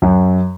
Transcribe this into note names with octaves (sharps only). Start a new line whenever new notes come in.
F#2